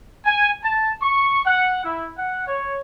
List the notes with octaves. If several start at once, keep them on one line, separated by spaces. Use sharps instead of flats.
G#5
A5
C#6
F#5
E4
F#5
C#5